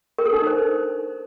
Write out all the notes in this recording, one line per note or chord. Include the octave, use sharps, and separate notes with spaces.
A#4
A4
D4
D#4
C5